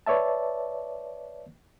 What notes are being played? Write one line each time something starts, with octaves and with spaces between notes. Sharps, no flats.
B4 C#5 D5 E5 A5